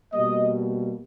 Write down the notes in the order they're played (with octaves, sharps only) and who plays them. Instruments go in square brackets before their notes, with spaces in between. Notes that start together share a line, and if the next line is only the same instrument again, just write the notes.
[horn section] B2 G3 A#3 D#5